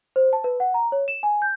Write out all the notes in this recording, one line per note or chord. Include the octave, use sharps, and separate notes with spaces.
C5
A5
B4
F#5
A#5
C#5
E7
G#5
G6